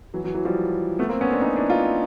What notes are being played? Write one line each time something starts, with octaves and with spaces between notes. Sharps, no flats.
E3 F#3
E3 F#3
E3 F#3
F3 G3
A3 B3
A#3 C4
B3 C#4
C4 D4
C#4 D#4
D4 E4
D#4 F4